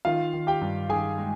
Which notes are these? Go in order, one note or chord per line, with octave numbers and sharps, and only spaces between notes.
D#3 F4 F5
D#3
G4 G5
G2
D#3 G#4 G#5
G#3